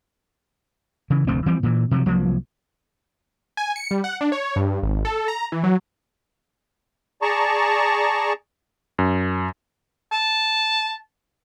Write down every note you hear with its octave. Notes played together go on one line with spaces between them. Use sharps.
C#3 E3
F1 D2 A3 C4
E3 F3 G3 C4
A#2 E3
C3 F3 F#3
C2 F3 F#3 A#3
G#5
C#7
G3
F#5
D4
C#5
G2
G#1
A4
A#5
E3
F#3
G#4 D5 A5 A#5 C#6
F#2
A5